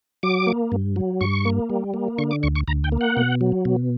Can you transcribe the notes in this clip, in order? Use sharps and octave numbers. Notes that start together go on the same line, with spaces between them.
F#3 D6
A#3
G2
F#3
G2 C#6
A#3
G3
A#3
D3 C#6
D6
D2 C#6
C#6
D2 A#5
G5
A#3
F#5
B2
F#3
B2